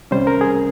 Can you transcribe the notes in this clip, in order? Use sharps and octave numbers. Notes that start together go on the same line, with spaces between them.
C2 C3 G3 C#4 C5
A#4
G#4